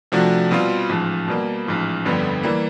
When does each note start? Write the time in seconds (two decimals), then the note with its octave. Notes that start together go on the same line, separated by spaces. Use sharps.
0.12 C3 F3 A3 D4 F#4
0.51 B2 G3 C4 F4
0.89 A1 G#2 F3
1.28 B2 G3 A#3
1.66 A1 G#2 F3
2.05 G1 F2 D3 G3 B3
2.43 E3 G3 A#3